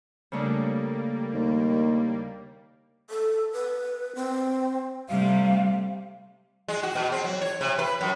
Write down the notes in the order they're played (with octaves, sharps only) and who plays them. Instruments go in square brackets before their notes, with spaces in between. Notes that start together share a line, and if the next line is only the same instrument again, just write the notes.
[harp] C#3 A3 D4 [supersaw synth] G3 A#3
[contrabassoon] D#2
[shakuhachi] A4
B4
C4
[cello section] C3 G3 A3 [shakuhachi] F5
[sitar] G#3
F#4
B2
C4
F#3
C#5
C3
B4
F#2